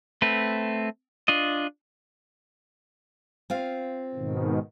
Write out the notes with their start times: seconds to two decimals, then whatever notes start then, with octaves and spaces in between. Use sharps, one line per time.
0.22 A3 C4 B4
1.28 D4 F4 D#5
3.50 C4 F4 F5
4.15 G#2 B2 D#3